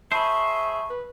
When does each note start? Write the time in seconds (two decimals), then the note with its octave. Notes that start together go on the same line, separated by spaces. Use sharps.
0.12 G#4 C5 E5 A5 B5 C#6
0.90 B4